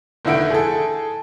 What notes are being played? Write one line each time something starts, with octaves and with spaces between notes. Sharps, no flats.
F1 D3 D#3 E4 F#5 D7
G#4 A4